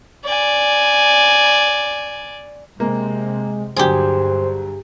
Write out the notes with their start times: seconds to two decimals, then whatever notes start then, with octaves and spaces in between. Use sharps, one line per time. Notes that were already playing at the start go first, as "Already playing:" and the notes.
0.25 D5 G#5
2.80 C3 G#3 A#3
3.76 D2 G2 F#3 G4 G#4 C5